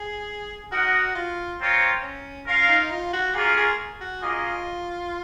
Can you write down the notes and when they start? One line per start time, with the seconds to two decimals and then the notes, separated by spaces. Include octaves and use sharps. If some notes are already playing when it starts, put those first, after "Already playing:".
Already playing: G#4
0.71 D#4 F#4 A#4 D#5 F#5
1.15 F4
1.60 C4 F4 A#4 C#5
2.03 C#4
2.47 C#4 F4 A#4 F5
2.68 D#4
2.91 F4
3.13 F#4
3.34 A#3 C#4 F4 G#4 A#4
3.57 G#4
4.01 F#4
4.22 A#3 C#4 F4 G#4 D#5